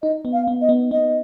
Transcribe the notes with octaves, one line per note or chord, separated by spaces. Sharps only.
D#4 D#5
B3
F5
B3
D#5
B3
B3 D#5